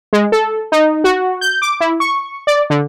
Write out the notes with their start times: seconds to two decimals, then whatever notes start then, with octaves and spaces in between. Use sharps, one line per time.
0.13 G#3
0.32 A4
0.72 D#4
1.04 F#4
1.41 G6
1.62 D6
1.80 E4
2.00 C#6
2.47 D5
2.70 D3